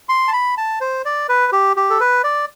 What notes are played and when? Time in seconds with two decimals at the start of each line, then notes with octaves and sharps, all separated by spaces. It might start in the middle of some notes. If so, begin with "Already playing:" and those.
0.09 C6
0.28 A5
0.33 B5
0.58 A5
0.81 C5
1.05 D5
1.29 B4
1.52 G4
1.77 G4
1.90 A4
2.01 B4
2.24 D5